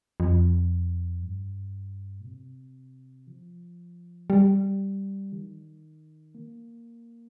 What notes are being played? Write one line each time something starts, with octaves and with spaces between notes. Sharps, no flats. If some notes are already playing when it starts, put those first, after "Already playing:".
F2
G2
A#2
C3
F3
G3
D#3
A#3